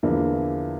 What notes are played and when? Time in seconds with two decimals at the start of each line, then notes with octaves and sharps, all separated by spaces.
0.03 E2 D3 F3 A#3 E4